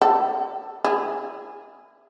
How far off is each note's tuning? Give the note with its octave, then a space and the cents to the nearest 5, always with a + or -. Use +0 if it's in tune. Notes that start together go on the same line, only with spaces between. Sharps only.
A4 +0 G5 -45
E4 +20 G#4 -15